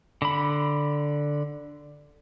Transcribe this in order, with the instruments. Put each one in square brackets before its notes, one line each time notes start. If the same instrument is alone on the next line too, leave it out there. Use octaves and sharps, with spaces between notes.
[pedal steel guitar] D3 B5